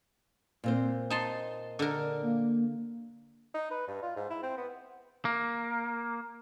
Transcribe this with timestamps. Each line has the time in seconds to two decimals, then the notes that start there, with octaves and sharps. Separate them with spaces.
0.64 A#2 C4 C5
1.10 D#4 A5 C6
1.79 D3 A#4
2.22 A#3
3.54 D#4
3.71 B4
3.87 G2
4.03 F4
4.16 G#2
4.30 E4
4.43 C4
4.57 B3
5.25 A#3